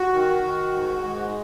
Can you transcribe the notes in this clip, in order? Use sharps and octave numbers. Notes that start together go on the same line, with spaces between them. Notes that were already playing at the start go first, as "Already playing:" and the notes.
Already playing: F#4
D#3
D#3
G#2
G#3